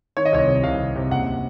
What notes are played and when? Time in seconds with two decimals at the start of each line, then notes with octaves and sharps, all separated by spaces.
0.17 D#3 C#5
0.25 D#5
0.33 C2 C#5
0.48 C3
0.63 C2 F5
0.79 C3
0.95 C3
1.11 F#1 F#5